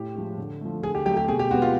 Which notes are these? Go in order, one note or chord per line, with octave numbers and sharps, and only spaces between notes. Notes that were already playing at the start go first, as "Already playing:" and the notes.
Already playing: A2 G4
F3 G#3
D3
F3 A3
D3 G#4
G4
F#3 A3 G4
G4
B2 G#4
G4
G#3 B3 F#4
F4